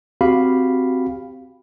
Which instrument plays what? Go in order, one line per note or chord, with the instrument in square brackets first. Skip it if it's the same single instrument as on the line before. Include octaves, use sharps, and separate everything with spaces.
[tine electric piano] C4 F#4 G4 F5 B5